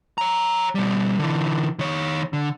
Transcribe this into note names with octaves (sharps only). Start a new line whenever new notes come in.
C#5 A#5
B2 G3
D3 E3
D#3 C#5
D3